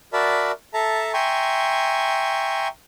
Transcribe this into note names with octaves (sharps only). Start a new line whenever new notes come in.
F#4 A#4 D5 E5 A5 B5
A4 E5 A5 A#5
E5 G5 G#5 A#5 C6 C#6